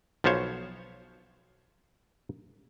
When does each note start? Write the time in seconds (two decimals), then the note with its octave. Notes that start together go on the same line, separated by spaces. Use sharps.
0.24 B1 F3 B3 C5 C#5